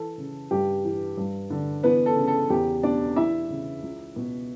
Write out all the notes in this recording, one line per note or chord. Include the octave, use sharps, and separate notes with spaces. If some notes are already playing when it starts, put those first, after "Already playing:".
Already playing: E3 A4
C#3
G2 G4
E3
G2
D3
E3 B3 B4
A4
C#3
A4
E2 G4
B2 D4 D5
E3 E4 E5
C#3
C#2
B2